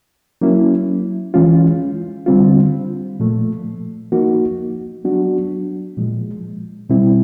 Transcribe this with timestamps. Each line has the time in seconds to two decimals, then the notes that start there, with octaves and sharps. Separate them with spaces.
0.41 F#3 A#3 C#4 E4
1.34 E3 G#3 C#4 F4
2.26 D3 G3 C4 F4
3.20 A#2 F3 A3
4.12 F3 A#3 D#4 F#4
5.04 F#3 B3 D4 F#4
5.97 A#2 F3 G#3
6.90 B2 G3 C4 E4